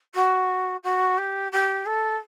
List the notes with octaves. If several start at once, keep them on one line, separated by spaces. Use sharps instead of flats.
F#4
F#4
G4
G4
A4